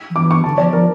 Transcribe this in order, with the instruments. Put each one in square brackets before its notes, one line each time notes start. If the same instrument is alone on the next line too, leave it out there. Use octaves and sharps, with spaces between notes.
[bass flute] F3
[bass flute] E3 [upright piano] D6
[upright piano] C#6
[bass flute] D3 [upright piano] A5
[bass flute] F3 [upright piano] D5
[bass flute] F3 [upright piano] A#4